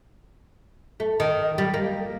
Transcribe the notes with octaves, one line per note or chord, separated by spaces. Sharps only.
A3
D#3
G3
A#3